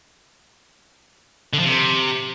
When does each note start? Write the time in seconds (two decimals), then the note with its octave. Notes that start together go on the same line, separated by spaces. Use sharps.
1.53 D3
1.59 F3
1.65 C3